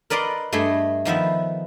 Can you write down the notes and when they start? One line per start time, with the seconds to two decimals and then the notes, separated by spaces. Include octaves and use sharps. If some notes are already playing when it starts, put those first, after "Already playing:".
0.10 A#4 B4 D5 D#5 A#5 C6
0.53 G2 A3 G#4 D#5
1.05 D#3 F3 B3 E5